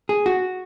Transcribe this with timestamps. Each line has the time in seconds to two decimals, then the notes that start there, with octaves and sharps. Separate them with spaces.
0.09 G#4
0.26 F#4